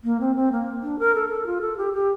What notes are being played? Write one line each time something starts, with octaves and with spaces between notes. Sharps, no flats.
A#3
C4
C4
A#3
D4
A#4
A4
A4
F4
A4
G4
G4